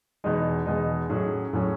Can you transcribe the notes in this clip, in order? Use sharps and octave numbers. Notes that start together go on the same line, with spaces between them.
E2 B2 G#3 D#4
E2 B2 G#3 D#4
A2 F#3 C#4 G#4
A2 F#3 C#4 G#4